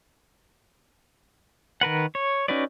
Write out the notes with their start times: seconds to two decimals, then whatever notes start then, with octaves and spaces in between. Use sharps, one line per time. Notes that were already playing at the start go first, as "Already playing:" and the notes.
1.81 D#3 A#4 B4 F#5
2.15 C#5
2.48 C#4 D#4 F#4 B4 D5